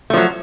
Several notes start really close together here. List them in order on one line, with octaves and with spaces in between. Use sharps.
A3 F3 F#3